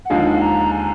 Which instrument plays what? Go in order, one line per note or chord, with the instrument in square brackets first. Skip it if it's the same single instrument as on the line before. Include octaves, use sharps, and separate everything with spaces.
[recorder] F#5
[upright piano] D#2 D3 F3 G#3 D#4 [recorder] F5
[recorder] A#5
G#5